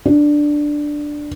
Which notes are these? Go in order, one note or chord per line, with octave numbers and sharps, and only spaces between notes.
D4